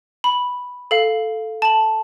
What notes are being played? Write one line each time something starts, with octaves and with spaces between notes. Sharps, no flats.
B5
A4 F5
A5 F#7